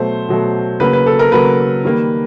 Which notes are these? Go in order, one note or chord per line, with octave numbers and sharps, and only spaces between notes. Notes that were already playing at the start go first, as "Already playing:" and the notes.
Already playing: B2 F#3 A3 C5
B2 F#3 A3
C#3 F#3 A#3 B4
B4
A4
A#4
C#3 F#3 A#3 B4
D#3 G3 A#3